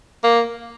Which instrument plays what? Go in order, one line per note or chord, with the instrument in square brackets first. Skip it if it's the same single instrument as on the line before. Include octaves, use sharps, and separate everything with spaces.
[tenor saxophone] A#3